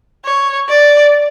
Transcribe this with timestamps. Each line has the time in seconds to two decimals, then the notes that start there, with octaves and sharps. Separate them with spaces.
0.24 C#5
0.69 D5